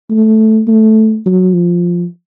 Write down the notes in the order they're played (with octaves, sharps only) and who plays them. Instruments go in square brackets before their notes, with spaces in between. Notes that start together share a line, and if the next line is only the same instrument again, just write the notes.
[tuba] A3
A3
F#3
F3